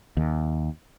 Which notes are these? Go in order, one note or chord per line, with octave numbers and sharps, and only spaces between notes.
D#2